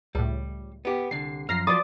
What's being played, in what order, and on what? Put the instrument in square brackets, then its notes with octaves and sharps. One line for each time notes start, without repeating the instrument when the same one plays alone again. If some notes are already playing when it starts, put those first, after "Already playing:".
[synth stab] C#2 A2 [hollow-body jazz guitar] G3
[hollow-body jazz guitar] B3 G4
[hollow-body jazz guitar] C2 D3 [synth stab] C7
[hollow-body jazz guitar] F#2 F3 [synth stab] F6 A#6 C7
[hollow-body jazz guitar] F3 F#3 C5 [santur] D5 D#6 [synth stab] A6